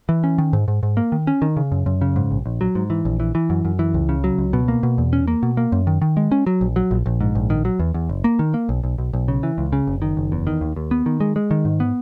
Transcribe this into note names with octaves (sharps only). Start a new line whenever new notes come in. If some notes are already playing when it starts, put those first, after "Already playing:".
E3
C#4
D#3
G#2
G#2
G#2
A#3
D#3
C#4
D#3
C#3
F#2
F#2
C#3
G#2
A#1
A#1
F#3
G#2
E3
A#1
E3
E3
F#2
F#2
E3
C#2
C#3
F#3
C#2
B2
A#3
B2
E2
C#4
A#3
B2
A#3
F#2
D#3
D#3
G#3
C#4
F#3
A#1
F#3
A#1
A#1
G#2
A#1
D#3
F#3
E2
E2
F#1
A#3
D#3
A#3
B1
B1
B1
B1
C#3
E3
C#2
C#3
F#1
D#3
F#1
E2
D#3
D#2
D#2
B3
D#3
G#3
G#3
D#3
G#2
B3